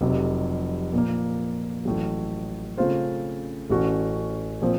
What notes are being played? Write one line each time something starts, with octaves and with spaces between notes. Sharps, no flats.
F1 F2 C3 F#3
A#2 F3 A#3
A1 A2 F#3
C#3 A3 C4 F4 C5
A1 A2 A3 C#4 F#4
A#2 F3 C4